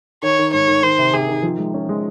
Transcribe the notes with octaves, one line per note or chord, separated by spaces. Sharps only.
D#3 C#5
D#3
G#2 C#5
D#3
D#3 C5
C3
C3 G#4
D#3
F3
G#3
C#4
G#3